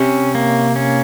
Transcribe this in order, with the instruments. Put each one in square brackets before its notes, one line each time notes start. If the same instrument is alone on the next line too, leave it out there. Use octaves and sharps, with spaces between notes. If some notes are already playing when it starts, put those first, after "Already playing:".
Already playing: [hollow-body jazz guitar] C3 [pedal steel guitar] C#4
[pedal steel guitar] A#3
C#4